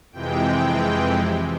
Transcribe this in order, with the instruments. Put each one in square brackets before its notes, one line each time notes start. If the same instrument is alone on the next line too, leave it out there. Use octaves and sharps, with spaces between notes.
[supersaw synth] F2 C3 E3 G#3 G5